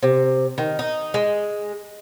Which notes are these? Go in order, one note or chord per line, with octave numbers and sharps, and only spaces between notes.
C3
D#3
D#4
G#3